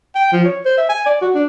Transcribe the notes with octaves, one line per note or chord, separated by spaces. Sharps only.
G5
F3
C#5
C5
E5
G#5
D5
F#4
D4